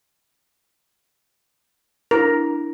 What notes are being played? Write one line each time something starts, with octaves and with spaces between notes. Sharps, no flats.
D4 E4 A#4